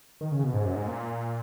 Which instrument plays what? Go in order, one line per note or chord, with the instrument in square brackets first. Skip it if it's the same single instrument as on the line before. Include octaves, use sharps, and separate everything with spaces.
[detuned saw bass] D#3
C#3
B2
G#2
F#2
G#2
A#2